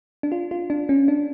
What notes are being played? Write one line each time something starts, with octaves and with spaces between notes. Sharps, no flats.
D4
F4
F4
D4
C#4
D4